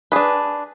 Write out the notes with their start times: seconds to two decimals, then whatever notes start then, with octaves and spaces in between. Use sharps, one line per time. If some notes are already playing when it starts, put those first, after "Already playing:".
0.12 D4 G#4 B4